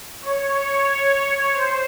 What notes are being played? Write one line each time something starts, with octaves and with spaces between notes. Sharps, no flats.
C#5
C#5
C5